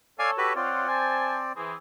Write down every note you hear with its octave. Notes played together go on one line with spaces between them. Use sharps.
A4 C#5 D5 F5 G#5
F#4 G4 B4
C4 F4 C#5 D5 F#5
C5 G#5 A5
E3 C4 G#4